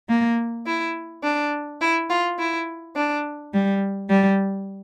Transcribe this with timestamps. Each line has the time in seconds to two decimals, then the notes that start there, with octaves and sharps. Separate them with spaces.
0.09 A#3
0.66 E4
1.23 D4
1.81 E4
2.10 F4
2.38 E4
2.95 D4
3.53 G3
4.10 G3